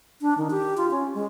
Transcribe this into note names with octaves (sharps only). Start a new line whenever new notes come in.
D4
D#3
G4
F4
C#4
G#3